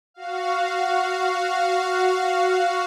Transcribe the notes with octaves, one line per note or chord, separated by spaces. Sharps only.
F#4 F5